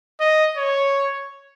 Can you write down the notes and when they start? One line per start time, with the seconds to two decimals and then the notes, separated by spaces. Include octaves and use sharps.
0.20 D#5
0.57 C#5